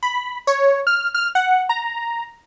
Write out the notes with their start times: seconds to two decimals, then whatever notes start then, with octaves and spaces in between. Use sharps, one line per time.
0.03 B5
0.47 C#5
0.87 F6
1.14 F6
1.35 F#5
1.69 A#5